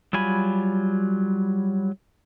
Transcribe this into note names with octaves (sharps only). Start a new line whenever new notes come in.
F#3 G3 F4 G#5 B5